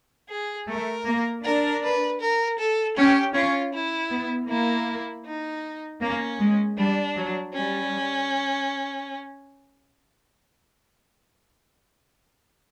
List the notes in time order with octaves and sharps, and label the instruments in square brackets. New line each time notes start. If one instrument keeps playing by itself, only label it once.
[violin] G#4
[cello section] A3 [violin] A#4
[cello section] A#3
[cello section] D4 [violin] A#4
[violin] B4
A#4
A4
[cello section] C#4 [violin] G4
[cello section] C#4 [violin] F4
[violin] E4
[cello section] B3
[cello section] A#3 [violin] E4
[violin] D#4
[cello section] A#3 [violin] C#4
[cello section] G#3
[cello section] G3 [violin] D4
[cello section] F#3
[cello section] G3 [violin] C#4